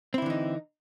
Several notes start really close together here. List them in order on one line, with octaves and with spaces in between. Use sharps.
C4 E4 D3 E3 D#4